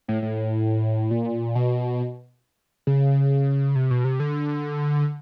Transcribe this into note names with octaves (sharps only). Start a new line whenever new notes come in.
A2
A2
A#2
B2
C#3
C3
B2
C3
D3